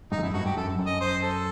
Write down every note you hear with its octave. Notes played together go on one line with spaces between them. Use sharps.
G2 D#4
E2
F#2 E4
G2 F#4
G2 G4
F#2 A4
F#2
D#5
C5
A4